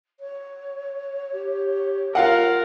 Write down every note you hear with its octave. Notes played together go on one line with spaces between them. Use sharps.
C#5
G4
F4 A#4 F5 F#5